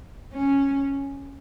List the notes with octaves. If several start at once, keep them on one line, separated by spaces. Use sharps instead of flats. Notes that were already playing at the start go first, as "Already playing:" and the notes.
C#4